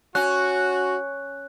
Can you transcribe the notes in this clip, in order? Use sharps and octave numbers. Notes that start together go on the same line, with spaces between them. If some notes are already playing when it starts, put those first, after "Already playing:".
C#4 F#4 F#6